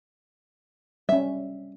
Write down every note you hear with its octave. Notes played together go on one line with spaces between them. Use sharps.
G3 C#4 E5